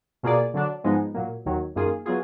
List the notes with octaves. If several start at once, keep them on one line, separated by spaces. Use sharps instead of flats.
B2 A#3 F4 G#4 D5
D3 F#3 D4
G#2 F3 G#3 B3 D#4
A#2 F#3 A#3
D#2 D#3 F#3
F#2 D#3 A#3 F4 G#4
F#3 B3 F4 G#4